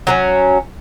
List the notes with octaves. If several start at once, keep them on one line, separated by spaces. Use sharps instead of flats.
F#3 A#3 C#4